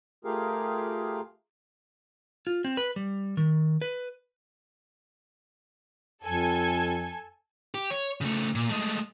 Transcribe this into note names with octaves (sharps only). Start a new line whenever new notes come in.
A3 F4 G4 G#4 A#4 F5
F4
C4
B4
G3
D#3
B4
F2 A4 G#5
G4
C#5
C#3 A3
A#2
G#3 A3